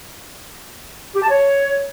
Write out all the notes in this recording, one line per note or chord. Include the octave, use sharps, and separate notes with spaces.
G4
A5
C#5